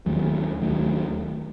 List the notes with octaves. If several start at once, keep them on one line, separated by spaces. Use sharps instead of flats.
D#2 D#3 F#3 A3
D#2 D#3 F#3 A3